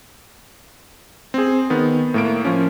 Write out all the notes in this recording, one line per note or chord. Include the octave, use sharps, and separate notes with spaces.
C4 G#4
D#3 B3
A2 A#3 D7
F3 C#4